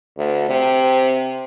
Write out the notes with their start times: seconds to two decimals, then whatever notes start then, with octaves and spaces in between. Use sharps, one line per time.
0.18 D2
0.49 C3